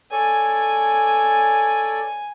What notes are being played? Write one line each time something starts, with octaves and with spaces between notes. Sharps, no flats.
A4 C#5 D5 G#5